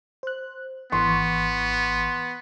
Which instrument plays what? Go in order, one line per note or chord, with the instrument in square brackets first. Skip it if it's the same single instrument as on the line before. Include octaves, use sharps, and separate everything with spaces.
[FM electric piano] C5 F#6
[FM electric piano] G#1 E3 C#6 [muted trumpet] B3 [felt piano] C6